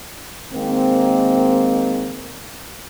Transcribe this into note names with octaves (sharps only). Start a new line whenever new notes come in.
D#3 G#3 A#3 C4